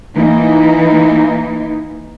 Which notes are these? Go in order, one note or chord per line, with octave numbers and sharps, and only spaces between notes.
E3 A#3 D#4